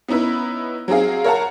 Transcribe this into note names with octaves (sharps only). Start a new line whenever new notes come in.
B3 C#4 D#4 E4 B4
F#3 C4 D#4 G#4 F5
A#4 C#5 F5 F#5 A5 A#5